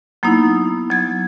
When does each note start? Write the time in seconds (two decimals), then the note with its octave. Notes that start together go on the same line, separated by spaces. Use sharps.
0.23 F#3 A#3 B3 D#4 E4
0.90 F#3 G#6